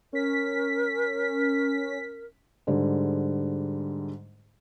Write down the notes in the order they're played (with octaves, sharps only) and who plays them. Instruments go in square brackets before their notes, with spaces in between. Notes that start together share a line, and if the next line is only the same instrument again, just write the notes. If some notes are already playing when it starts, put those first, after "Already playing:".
[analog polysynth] C#4 B6 [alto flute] A#4
[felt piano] G#2 D3 G3